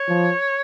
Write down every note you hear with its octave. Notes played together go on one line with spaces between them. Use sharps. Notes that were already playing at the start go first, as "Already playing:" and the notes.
Already playing: C#5
F3